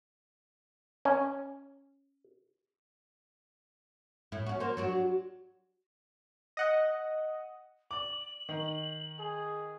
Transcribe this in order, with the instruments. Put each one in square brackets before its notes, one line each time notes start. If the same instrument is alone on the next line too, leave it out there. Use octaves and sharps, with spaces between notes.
[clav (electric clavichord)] C#4
[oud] A2 E4
C#4 F#4
A#3 C5
F#3 D4 F#4
[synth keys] D#5 F#5
[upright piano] D5 D6 [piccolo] F#7
[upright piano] D#3
[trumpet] G#4